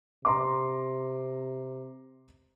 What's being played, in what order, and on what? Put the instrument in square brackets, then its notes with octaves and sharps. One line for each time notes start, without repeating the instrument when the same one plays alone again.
[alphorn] C3 [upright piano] A#5 C6 D6